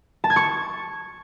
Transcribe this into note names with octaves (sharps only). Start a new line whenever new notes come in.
A5
G#6
C#6